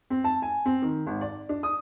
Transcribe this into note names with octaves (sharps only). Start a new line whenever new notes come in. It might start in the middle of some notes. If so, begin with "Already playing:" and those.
C4
A5
G#5
C4
D#3
G#1
D5
D4
D#6